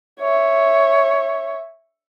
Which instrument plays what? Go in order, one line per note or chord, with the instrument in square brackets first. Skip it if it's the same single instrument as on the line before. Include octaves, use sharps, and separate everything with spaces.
[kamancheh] C#5 E5